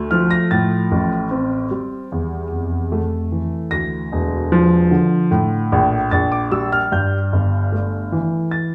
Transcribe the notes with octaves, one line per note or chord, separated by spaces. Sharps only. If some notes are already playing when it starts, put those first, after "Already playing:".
Already playing: D2 A3
F3 F6
A#6
A2 A6
A1
C4
G3
E2
F1
A3
E3
D2 A#6
E1
F3
D3
A2
A#1
A#1 A6
D6
G3 E6
F6
G2 G6
G1
A3
E3
A6